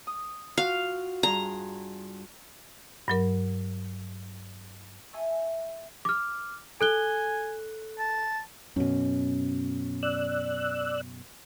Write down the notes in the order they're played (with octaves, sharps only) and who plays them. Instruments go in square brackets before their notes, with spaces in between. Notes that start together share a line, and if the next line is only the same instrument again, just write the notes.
[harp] D#6
[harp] F4 F#4 [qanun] F5
[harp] G2 G#4 C6 [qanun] A#5
[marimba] G2 F#3 A#4
[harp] E5 G#5 A5 C#6 D#6 E6
[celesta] D6 F6
[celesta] A4 F#6 G7 [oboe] G#5
[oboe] A5
[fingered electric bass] F#2 B2 [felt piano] C#4
[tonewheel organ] D5 E6 F#6